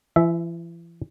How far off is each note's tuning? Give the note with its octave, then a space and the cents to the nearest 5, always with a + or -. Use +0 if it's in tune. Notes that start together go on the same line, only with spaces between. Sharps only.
E3 +40 E5 +0